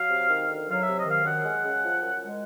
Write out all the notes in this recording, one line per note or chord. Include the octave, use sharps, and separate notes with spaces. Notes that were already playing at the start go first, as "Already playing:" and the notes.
Already playing: F#3 F5
C3
D#3
D2
F#3 F5
E5
C3
D#5
D#3
F5
F#2 F#5
G#3
C#3
F3
F#2
G#3